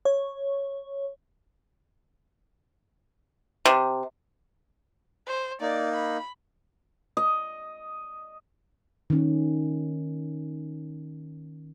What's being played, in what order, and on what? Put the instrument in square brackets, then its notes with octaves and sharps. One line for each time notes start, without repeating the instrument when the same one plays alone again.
[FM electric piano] C#5
[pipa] C3
[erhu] C5
[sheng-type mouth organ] A#3 D#4 [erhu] D5
[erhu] B5
[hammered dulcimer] D#5
[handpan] D#3 C#4